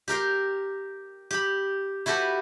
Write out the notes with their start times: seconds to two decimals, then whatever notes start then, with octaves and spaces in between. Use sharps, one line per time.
0.08 G4 A#4 G5 C6
1.31 G4 B5
2.06 E4 F#4 G4 A4 B4